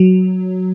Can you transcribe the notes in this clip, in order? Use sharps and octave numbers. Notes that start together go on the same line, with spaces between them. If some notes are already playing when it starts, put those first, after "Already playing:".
Already playing: F#3